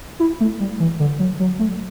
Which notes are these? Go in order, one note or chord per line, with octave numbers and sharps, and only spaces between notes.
E4
A3
G3
E3
D3
F#3
F#3
A3